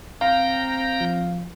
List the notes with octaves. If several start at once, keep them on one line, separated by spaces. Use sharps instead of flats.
C4 F5 G5 A#5
F3